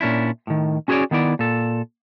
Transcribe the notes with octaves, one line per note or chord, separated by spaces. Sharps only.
A#2 C#4 D4 E4
A2 D#3
C#4 F#4 G#4 B4 C#5 D5
D#3 B3 E4 D5
A#2 A4